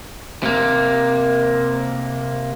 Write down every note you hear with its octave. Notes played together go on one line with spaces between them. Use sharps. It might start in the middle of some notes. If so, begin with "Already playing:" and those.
C3 A#3